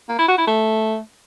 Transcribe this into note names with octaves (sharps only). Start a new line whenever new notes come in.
A#3
E4
F#4
E4
A3